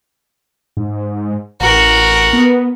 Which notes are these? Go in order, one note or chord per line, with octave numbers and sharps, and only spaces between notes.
G#2
A1 F#4 A#4
B3